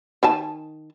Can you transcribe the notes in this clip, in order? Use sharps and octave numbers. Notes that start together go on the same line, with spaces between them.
D#3 G#5 A5